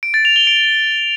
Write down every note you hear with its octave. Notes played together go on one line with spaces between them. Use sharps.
D7
A6
F7
G7
D7